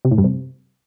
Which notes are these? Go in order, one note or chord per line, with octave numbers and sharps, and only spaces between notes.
C3
A2
G2
C3